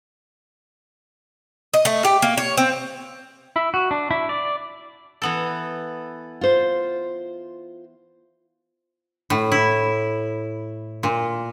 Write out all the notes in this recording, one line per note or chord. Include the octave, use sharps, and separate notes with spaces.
D#5
A3
G4
A#3
C#5
C4
E4
F#4
D4
E4
D5
E3 B3 A4
F4 C5
A2
E4
A#2